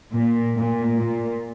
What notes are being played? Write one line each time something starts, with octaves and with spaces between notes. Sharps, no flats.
A#2
A#2
A#2